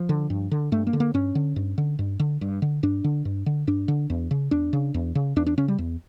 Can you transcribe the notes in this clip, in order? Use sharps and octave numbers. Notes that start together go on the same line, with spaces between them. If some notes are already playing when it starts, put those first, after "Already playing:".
Already playing: F3
D3
G2
D3
G2 A3
A#3
D3
A#3
G2 C#4
D3
G2
D3
G2
D3
G2
D3
G2 D4
D3
G2
D3
G2 D4
D3
E2
C#3
E2 D4
C#3
E2
C#3
E2 D4
D4
C#3 C#4
G3
E2